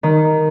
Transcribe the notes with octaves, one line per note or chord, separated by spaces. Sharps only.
D#3